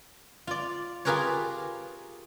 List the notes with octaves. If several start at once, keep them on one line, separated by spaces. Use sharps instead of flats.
F4 D5
F4 G4 G#4 A#4 B4 C#5